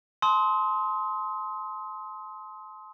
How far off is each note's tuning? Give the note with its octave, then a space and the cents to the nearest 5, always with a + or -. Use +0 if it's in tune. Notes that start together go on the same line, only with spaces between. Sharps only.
A5 -35 C6 +0 D#6 +35